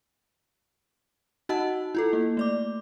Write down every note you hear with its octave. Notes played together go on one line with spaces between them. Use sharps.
D#4 F#4 D#5 F#5 A5 E6
E4 F4 A4
A#3
A3 D5 D6